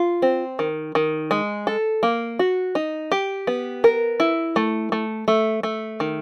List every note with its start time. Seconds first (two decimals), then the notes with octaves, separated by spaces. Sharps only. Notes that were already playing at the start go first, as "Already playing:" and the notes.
Already playing: F4
0.22 C4
0.59 D#3
0.95 D#3
1.31 G#3
1.67 A4
2.03 A#3
2.39 F#4
2.75 D#4
3.12 G4
3.47 B3
3.84 A#4
4.20 E4
4.56 A3
4.92 A3
5.28 A3
5.63 A3
6.00 D#3